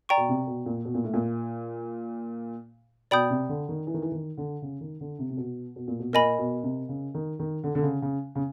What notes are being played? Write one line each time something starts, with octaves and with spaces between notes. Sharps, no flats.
D5 G5 A#5 C#6
B2
C3
B2
A#2
B2
A#2
A2
A#2
B2 D5 G5 B5 D#6 G6
C3
D3
D#3
E3
D#3
E3
D#3
D3
C#3
D#3
D3
C3
C3
B2
B2
A#2
B2
A#2 A#4 D#5 G#5 B5
B2
C3
C#3
D#3
D#3
D3
D3
C#3
C#3
C#3